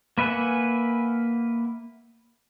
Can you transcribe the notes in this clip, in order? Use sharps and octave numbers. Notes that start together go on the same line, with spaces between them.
A#3 B4 E5 F#5 G#5